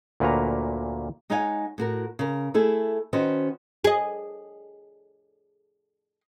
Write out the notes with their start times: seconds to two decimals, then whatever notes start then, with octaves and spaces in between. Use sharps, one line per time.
0.20 D2 A#2 A#3 B4 C#5 A#5
1.30 G#3 D#4 C#5 F5 F#5 G#5
1.78 A2 F#4 A#4
2.19 C#3 A#4
2.54 A3 E4 G#4 A4
3.13 D#3 C#4 F#4 B4 C5
3.84 G#4 D#5